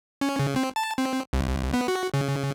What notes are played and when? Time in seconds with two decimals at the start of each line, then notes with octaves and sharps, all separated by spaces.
0.21 C#4
0.39 C#3
0.56 C4
0.76 A5
0.98 C4
1.33 C2
1.74 B3
1.88 F#4
2.14 C#3